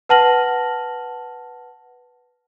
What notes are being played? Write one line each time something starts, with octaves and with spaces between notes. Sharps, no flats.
B4 F#5 A5 F6 A#6 F#7